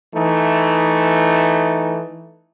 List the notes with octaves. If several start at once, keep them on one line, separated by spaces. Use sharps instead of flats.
E3 A3 D#4